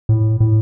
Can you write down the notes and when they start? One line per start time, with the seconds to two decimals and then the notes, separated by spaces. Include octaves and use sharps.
0.09 A2
0.40 A2